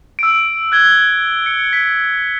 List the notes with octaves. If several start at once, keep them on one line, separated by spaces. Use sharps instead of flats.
E6 D7
F#6 G#6 G7
C#7
B6